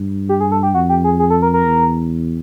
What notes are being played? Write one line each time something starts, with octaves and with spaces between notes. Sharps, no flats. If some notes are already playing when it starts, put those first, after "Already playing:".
Already playing: G2
G4
G#4
A4
G4
F2 F#4
G4
G#4
G#4
A4
A#4
A#4
E2